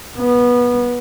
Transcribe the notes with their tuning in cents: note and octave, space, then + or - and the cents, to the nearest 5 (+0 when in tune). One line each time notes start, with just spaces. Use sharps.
B3 -20